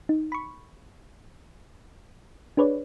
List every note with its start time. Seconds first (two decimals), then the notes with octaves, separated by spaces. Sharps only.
0.09 D#4
0.32 B5 C#6
2.57 D4 G#4 B4 C#5 D5